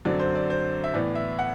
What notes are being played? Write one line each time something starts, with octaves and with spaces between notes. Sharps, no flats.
F#2 D3 F#3 C4 D5
C5
D5
C5
E5
A2 E3 B3 D5
E5
F#5